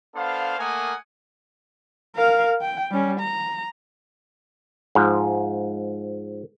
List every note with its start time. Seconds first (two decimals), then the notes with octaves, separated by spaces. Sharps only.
0.15 B3 D4 A4 C5 F5
0.58 A3 A#3 A#4 F#5 G#5 D#6
2.16 A#4 F5
2.61 G5
2.91 G3 C#4
3.20 A#5
4.95 G#2 F3